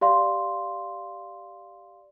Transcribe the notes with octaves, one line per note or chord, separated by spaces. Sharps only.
G4 D5 F5 C6